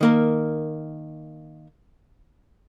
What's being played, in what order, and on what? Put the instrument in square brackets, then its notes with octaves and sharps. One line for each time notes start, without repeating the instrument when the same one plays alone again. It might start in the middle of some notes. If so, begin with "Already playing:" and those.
[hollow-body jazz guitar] D#3 A#3 A#4